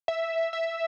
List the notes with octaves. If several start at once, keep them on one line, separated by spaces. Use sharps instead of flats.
E5
E5